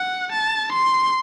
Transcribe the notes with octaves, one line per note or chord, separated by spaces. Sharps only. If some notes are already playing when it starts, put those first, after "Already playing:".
Already playing: F#5
A5
C6